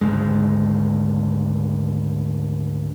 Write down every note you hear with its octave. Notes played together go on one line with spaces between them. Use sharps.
G#1 D2 G#2 G#3